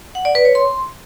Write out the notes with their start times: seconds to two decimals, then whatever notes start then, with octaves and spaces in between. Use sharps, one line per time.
0.15 F#5
0.25 D5
0.35 B4
0.45 C#5
0.55 C6